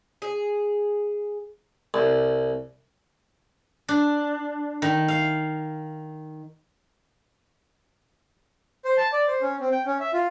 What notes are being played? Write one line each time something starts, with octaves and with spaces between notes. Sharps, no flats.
G#4
C2
D4
D#3
F5
C5
A5
D5
C5
C#4
C4
G5
C#4
E5
F4